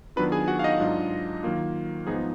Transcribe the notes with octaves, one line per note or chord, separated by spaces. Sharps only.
D#3 F#3 B3 D4 F4 B4 B5
G#4 G#5
F#4 F#5
F5
D#4 D#5
G#2 F#3 D4 F4
D#3 F#3 A#3 F4
G#2 F3 B3 D#4 G#4